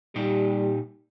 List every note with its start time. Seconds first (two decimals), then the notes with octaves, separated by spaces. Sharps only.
0.16 A#2 G3 D#4 G4